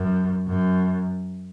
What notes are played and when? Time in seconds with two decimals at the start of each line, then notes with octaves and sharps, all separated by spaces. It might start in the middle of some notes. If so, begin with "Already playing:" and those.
Already playing: F#2
0.47 F#2